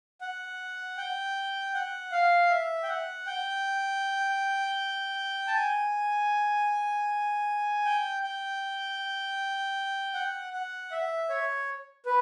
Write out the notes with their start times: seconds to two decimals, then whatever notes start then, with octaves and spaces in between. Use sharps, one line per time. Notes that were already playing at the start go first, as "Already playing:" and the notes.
0.21 F#5
0.97 G5
1.74 F#5
2.12 F5
2.50 E5
2.83 G5
2.88 F#5
3.27 G5
5.48 A5
5.55 G#5
7.85 G5
8.23 G5
10.14 F#5
10.53 F#5
10.91 E5
11.29 C#5
12.06 B4